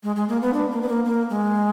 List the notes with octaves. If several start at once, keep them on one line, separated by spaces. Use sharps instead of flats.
G#3
G#3
A#3
B3
D4
A#3
B3
A#3
A#3
G#3